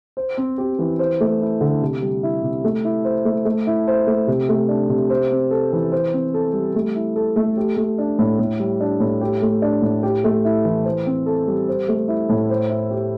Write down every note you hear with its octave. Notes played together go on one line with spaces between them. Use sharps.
C5
C4
G4
E3
C5
A3
E4
D3
C3
G3
E4
C3
A3
E4
C5
A3
A3
E4
C5
A3
C3
A3
D4
C3
C5
C4
A4
E3
C5
C4
A4
G3
A3
E4
A4
A3
G4
A3
D4
A2
A2
G3
D4
A2
G4
A3
D4
A2
G4
A3
E4
E3
C5
C4
A4
G3
C5
A3
E4
A2
C5
E4
G4